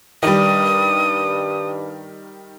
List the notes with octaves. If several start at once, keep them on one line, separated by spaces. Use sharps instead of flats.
G2 D#3 G3 D#6